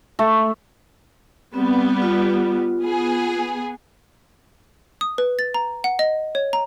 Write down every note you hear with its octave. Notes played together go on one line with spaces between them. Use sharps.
A3
G3 B3 C4
F4
B3 G#4
D#6
B4
A6
A#5
F#5
D#5
C#5
A#5